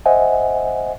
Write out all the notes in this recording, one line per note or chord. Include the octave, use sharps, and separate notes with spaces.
C5 D#5 E5 F#5 G#5